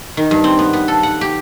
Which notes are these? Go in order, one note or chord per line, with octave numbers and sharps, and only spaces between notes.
D#3
G2
C4
B3
B3
A4
F#5
G4